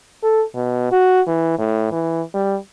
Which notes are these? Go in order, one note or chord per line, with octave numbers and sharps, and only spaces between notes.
A4
B2
F#4
E3
A2
E3
G3